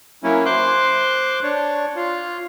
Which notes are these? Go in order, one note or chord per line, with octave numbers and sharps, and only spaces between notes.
F#3 A#3 C#4 E4
C5 C6 D6 F#6
D4 C#5
F4